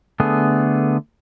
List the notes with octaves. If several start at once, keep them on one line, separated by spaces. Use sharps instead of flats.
D3 A3 B3 G#4